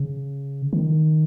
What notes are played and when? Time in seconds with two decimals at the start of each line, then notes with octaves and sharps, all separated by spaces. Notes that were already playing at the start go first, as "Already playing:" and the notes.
Already playing: C#3
0.73 D#3